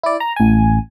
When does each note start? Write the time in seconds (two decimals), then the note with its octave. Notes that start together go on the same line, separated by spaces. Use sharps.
0.03 E4 D5
0.20 A#5
0.36 A1 G#5